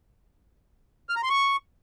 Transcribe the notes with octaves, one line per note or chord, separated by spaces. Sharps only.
F6
A#5
C6
C#6